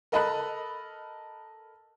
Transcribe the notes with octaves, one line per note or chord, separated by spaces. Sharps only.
A4 A#4 D#5 A5 B5 F#6